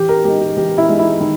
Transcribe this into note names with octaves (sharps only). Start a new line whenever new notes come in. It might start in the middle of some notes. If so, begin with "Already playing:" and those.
Already playing: E3 G4
A#4
G#3 D#4 G4
G4
E3 G4
E4
G#3 D#4
E4
D#3